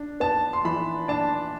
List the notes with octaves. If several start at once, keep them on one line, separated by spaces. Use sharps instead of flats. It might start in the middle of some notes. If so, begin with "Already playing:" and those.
Already playing: D4
B3 A5
C6
E3 B5
D4 A5